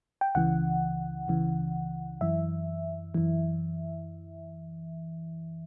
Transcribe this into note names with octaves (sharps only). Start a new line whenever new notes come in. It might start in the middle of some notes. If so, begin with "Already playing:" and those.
G5
C#2 C#3 E3 F#5
C#2 C#3 E3
F#2 E3 E5
F#2 E3